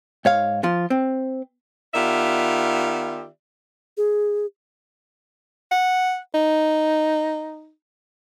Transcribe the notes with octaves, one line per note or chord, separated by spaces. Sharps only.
G#2 C#5 F5
F3 F4
C4
D#3 B3 F4 G4 D5 E5
G#4
F#5
D#4